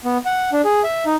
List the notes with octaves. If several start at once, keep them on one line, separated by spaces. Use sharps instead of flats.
B3
F#5
D4
G#4
E5
D#4